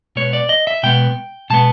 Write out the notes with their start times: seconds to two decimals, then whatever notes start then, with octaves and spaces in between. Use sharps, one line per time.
0.16 B2 G#3 B3 C#5
0.33 D5
0.49 D#5
0.67 E5
0.83 B2 G#3 B3 G5
1.50 B2 G#3 B3 A5